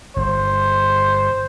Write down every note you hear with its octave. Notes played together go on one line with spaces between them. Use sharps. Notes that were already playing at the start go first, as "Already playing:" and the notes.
G1 C5